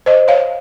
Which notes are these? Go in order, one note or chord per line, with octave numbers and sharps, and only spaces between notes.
C5 D#5
C#5 F5